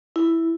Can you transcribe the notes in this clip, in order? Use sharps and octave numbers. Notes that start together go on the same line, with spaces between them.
E4